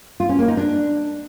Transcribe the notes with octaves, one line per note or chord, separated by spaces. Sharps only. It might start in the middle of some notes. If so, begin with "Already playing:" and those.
F4
C#4
A#3
D#4
D4